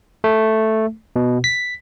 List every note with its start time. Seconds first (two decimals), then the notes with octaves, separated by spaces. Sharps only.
0.24 A3
1.16 B2
1.44 B6